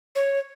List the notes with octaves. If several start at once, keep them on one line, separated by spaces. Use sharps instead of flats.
C#5